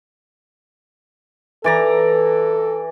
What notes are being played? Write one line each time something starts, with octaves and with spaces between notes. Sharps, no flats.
E3 A4 D5 A#5